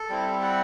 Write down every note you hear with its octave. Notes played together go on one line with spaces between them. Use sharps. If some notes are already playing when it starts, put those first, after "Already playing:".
Already playing: A4
G3 C4 E4
F#5